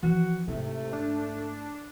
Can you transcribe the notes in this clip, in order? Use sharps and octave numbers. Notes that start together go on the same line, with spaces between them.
E3 F3 F#4
G#2 C3 A3 E4
D4